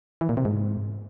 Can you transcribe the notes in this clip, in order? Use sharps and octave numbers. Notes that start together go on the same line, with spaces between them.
E3
A#2
C3
G#2